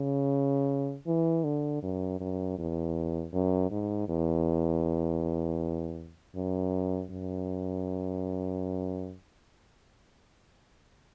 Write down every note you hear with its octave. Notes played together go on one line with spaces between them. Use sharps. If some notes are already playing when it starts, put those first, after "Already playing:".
Already playing: C#3
E3
D3
F#2
F#2
E2
F#2
G#2
E2
F#2
F#2